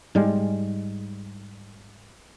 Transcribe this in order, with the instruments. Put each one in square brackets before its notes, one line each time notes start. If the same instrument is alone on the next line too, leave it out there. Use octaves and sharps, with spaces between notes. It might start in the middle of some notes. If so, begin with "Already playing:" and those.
[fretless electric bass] G#2 G3 G#3